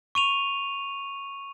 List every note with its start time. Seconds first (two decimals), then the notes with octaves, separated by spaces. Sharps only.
0.15 C#6 D#7 F7